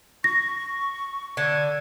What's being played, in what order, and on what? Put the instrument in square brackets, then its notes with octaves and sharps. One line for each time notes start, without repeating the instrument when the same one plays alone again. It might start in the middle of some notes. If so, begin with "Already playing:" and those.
[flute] C#6 [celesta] A#6
[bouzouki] D3 [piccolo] G#6